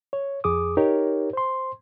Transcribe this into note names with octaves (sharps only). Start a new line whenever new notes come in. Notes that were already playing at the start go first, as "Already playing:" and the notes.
C#5
F2 G#4 D6 D#6
D#4 G4 A#4 C#5
C5 C6